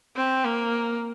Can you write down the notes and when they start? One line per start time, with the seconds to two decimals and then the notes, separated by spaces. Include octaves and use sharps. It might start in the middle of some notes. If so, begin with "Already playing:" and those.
0.16 C4
0.44 A#3